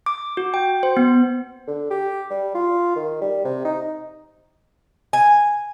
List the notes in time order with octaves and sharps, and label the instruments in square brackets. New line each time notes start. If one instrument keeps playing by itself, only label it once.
[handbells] D6
F#4
G5
C5
B3
[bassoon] D3
G4
G3
F4
D#3
G3
C3
D#4
[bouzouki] G#5